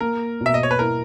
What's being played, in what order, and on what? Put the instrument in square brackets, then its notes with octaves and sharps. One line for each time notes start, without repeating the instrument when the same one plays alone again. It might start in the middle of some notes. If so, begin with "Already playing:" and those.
[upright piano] A#3 [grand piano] A#4
[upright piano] B2
[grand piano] E5
D#5
C#5
B4
[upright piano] E4 [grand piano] A#4